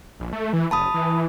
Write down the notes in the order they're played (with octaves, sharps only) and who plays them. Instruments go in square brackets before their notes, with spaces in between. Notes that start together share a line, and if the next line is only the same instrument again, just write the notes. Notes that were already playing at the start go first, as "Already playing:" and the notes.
[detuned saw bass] A#1
A3
E3
[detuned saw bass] F#1 [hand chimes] A5 B5 D#6
[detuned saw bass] E3